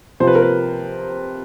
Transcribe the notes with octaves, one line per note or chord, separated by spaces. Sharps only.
C3 F3 C5
B4
A#4
B4